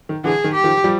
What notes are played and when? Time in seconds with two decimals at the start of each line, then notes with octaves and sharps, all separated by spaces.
0.09 D#3
0.24 D3 E3 G#4
0.44 D#3
0.54 G4
0.64 D#3 F3
0.84 F3 G3